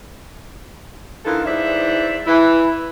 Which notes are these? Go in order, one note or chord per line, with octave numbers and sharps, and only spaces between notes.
D3 E3 D#4 F4 A4 A#4
G#2 E3 C5 D5 E5
E3 E4